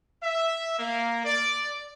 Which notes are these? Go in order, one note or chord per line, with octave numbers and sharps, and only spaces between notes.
E5
A#3
D5